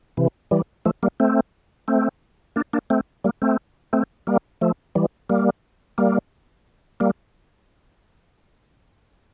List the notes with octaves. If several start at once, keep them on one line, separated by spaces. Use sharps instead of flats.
C3 E3
E3 G3
F3 A3
G3 A#3
A3 C4
A3 C4
A#3 D4
A#3 D4
A3 C4
G3 A#3
A3 C4
A3 C4
G3 A#3
F3 A3
E3 G3
G3 A#3
G3 A#3
G3 A#3